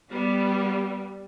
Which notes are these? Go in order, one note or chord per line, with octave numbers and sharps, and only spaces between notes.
G3 B3